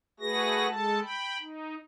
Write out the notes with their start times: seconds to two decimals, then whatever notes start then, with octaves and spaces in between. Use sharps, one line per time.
0.20 A3 F#4 G#4 B4 A#6
0.69 G#3 A4 A5
1.02 G5 B5
1.40 D#4